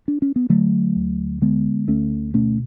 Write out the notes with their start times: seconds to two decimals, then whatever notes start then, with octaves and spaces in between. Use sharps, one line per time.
0.08 D4
0.22 C#4
0.36 B3
0.49 D3 F#3 A3
0.96 D2
1.42 D3 G#3 B3
1.88 D2 A3 C#4
2.34 B2 A3 C#4